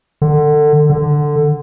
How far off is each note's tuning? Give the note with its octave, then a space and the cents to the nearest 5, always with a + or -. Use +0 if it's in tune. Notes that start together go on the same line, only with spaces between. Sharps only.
D3 +25
D3 +10